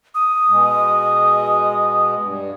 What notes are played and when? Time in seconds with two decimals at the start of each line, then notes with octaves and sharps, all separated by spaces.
0.15 D#6
0.49 B2 G#3
2.21 G2